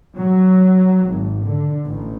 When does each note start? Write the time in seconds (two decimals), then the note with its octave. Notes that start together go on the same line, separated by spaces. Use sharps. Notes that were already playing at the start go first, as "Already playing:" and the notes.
0.17 F#3
1.09 G#1
1.45 D3
1.86 A1